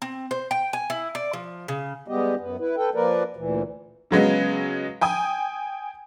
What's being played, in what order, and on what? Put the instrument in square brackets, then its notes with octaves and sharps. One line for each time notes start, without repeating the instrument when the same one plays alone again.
[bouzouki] C4
C5
G5
G#5
E4
D5
F3
C#3
[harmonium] G3 G#3 B3 G4 D#5
F#2 B3
E4 B4
A4 B4 G5
F3 A#3 A#4 B4 D5
D2 A#2 E3
[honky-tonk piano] C#3 F#3 G#3 B3
G5 G#5 D#6